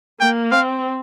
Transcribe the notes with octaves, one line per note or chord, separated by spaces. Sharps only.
A#3 G5
C4 F5